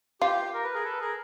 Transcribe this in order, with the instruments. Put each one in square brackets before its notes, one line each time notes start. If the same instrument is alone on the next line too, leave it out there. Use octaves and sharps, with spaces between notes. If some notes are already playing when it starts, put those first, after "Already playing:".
[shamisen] F4 [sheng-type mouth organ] G4
[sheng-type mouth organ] A#4
B4
G#4 A#4
A4 B4
G#4 A#4